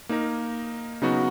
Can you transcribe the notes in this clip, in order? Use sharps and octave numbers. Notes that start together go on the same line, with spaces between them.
A#3 D#4 A#4
C#3 F#3 B3 D#4 F#4